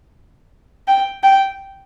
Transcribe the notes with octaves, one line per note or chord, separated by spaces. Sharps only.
G5
G5